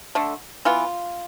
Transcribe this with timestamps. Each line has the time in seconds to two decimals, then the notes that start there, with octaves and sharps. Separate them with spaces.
0.15 D3 A3
0.65 E3 B3 F4